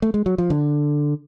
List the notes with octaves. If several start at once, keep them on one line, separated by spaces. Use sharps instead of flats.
A3
G#3
F#3
F3
D3